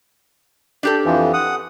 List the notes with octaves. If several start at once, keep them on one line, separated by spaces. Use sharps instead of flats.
D4 G4 A4
F2 E3 F3
F#5 D#6